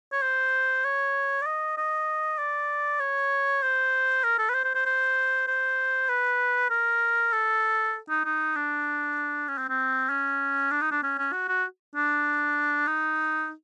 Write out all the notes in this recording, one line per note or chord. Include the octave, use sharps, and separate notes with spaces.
C#5
C5
C#5
D5
D#5
D#5
D5
C#5
C5
A#4
A4
B4
C5
C5
C5
C5
C5
B4
A#4
A4
D#4
D#4
D4
C#4
C4
C4
C#4
D4
D#4
D4
C#4
C#4
F#4
F#4
D4
D#4